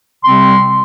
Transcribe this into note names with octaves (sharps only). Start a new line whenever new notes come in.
C3 G3 C4 C6